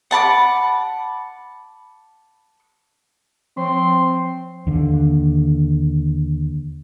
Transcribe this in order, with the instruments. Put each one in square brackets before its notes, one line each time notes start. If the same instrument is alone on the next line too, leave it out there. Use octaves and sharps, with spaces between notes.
[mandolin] F#5 A5 B5 D6
[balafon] F3 [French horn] C4 [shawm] C6
[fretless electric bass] D#2 D3